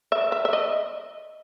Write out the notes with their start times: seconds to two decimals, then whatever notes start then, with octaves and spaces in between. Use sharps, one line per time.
0.12 E5
0.32 E5
0.45 E5
0.53 D#5